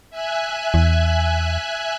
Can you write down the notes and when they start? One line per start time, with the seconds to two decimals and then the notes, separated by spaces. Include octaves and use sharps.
0.10 E5 G#5 F#6
0.74 E2